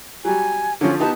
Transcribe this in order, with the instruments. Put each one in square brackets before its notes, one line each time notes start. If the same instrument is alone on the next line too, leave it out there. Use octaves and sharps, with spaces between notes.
[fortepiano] F#3 G3 [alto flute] G#5
[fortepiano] D3 F3 [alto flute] C#4
[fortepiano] B3 D#4 G4 [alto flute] A5